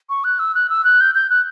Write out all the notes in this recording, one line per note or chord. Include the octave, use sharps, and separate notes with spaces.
C#6
F#6
E6
F#6
E6
F#6
G6
G6
F#6